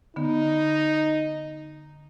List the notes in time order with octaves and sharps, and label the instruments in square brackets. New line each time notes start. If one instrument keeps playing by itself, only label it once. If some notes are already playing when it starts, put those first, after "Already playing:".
[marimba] D3 B3 [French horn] D#4